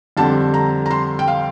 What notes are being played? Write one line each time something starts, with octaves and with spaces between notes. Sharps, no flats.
F2 D3 G3 C4 A5
A#5
A#5
C6
G5
F5